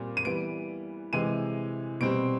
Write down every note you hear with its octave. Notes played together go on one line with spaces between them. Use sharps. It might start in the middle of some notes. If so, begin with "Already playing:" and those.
Already playing: A#2 G3 C4
D#7
E3 G3 B3 D7
C3 E3 G#3 D#7
B2 G3 C4 D7